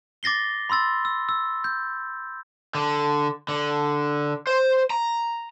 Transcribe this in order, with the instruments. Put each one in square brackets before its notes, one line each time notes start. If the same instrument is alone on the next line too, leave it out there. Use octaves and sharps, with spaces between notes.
[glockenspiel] D6 A6 A#6 C7 G7
B5 C6 E6 A6
E6
E6
G6
[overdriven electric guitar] D3
D3
C5
A#5